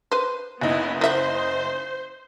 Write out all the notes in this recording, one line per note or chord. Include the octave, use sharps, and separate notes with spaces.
B4 C5
F#1 B3 D#4 E4
E3 C5 E5 F#5